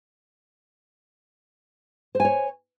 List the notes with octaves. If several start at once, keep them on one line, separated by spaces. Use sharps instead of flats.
C5 C#5 G#5